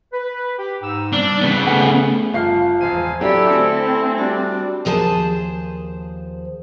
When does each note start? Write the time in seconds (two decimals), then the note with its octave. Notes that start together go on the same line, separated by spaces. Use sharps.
0.13 B4
0.59 G4
0.82 G#2 D#4 E6
1.13 G3 A#3 C4 D4
1.41 C#3 B3
1.67 A3 C#4 G#4 F#5
2.34 G1 F4 F5 A5 C7
2.81 E1 F3 C5 F5 G#5 D#7
3.21 F#3 D4 E4 G4 A4 D5 E5 B5
3.50 D3 A3 C4 G#5
4.18 G3 D4 F#4 D5
4.85 D#2 F3 G#4 C5 A5